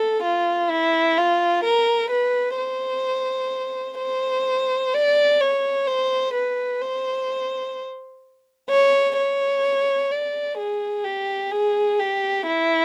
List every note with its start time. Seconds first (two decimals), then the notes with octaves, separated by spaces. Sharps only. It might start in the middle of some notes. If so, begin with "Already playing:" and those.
Already playing: A4
0.23 F4
0.70 E4
1.18 F4
1.64 A#4
2.11 B4
2.58 C5
3.99 C5
4.94 D5
5.41 C#5
5.87 C5
6.34 B4
6.82 C5
8.69 C#5
9.17 C#5
10.11 D5
10.58 G#4
11.04 G4
11.51 G#4
11.99 G4
12.46 E4